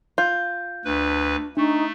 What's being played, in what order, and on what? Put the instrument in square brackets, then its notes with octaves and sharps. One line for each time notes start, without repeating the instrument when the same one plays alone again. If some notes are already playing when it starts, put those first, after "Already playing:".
[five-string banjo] F4 [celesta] G6
[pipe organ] D2 B4 [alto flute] D4
[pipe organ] A3 [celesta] D4 C#6 [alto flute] D#4